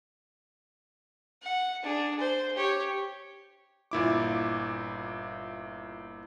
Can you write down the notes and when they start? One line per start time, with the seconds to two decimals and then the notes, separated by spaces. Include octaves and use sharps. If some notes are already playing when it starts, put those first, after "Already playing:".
1.42 F#5
1.83 D4 G#4
2.19 C5
2.56 G4 C#5
3.91 G1 A#2 E4 D6